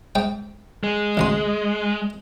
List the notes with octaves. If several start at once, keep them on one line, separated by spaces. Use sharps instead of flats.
G#2 G5
G#3
A1 D2 C6